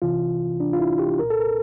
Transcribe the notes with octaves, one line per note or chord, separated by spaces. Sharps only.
C2 C3 E3 F4
D4
F4
E4
G4
C2 A#2 A#4
A4
A#4